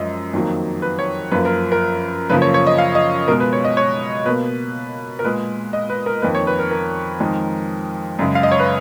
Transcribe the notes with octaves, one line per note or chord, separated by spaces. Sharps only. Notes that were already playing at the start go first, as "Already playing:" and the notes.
Already playing: F#2 F3 G#3 D#5
F2 D#3 F#3 A#3
B4
C#5
F#2 F3 A#3 B4
A#4
A#4
F#2 C#3 F3 A#3 B4
C#5
C#5
D#5
F5
D#5
B2 G#3 A#4
B4
C#5
D#5
C#5
B2 A#3 B4
A#4
A#2 G#3 B4
D#5
B4
A#4
F2 D#3 A#3 B4
C#5
B4
A#4
A#4
F2 D#3 G#3
F#2 C#3 G#3
F5
D#5
C#5
B4